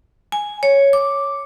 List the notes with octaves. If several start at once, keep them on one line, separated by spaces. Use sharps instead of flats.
G#5
C#5
D6